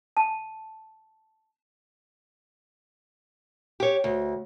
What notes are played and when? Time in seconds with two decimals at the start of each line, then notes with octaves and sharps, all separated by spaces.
0.17 A5
3.80 G4 C#5
4.04 D2